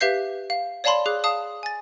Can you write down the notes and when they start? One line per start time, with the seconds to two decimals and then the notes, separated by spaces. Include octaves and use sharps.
0.01 G4 B4 E5 F5 G6 C7
0.50 F5
0.84 C#5 D5 F5 A5 B5 C6
1.06 G#4 F5 D6 F#6
1.24 F5 A5 D#6
1.63 G#5 A6